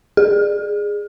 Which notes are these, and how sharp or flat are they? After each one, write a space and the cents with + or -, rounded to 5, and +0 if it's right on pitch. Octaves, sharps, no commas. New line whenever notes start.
G#4 -5